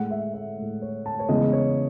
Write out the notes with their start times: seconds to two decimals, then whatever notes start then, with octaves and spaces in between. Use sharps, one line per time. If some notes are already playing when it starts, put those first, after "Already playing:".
Already playing: A2 G#3 F#5
0.10 E5
0.34 E5
0.58 A2 G#3
0.82 C#5
1.06 A5
1.19 C#5
1.29 E2 C#3 E3 G#3 D#5
1.53 C#5